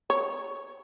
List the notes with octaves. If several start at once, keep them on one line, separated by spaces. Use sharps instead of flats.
C#5